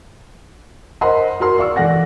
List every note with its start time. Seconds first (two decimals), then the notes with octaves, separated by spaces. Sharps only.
1.01 A#4 C5 D#5 F#5 B5 C6
1.40 F#4 A#4 C6
1.58 D5 F5 C#6 E6
1.76 E3 A4 D5 F#5 A#6